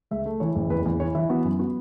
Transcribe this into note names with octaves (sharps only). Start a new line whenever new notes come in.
C#2 E5
A3
E3 C#5
F#1
E2 B4
E2
E3 C#5
E3 E5
B3 F#4
F#2
B3 F#4